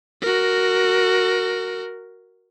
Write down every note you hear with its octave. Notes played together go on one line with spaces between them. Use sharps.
F#4 A#4